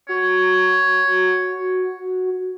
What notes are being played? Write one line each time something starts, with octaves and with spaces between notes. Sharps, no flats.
F#4 C#5